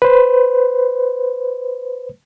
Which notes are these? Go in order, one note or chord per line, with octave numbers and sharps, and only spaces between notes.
B4 C5